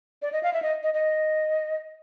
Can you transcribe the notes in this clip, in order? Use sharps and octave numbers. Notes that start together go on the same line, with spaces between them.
D5
D#5
F5
E5
D#5
D#5
D#5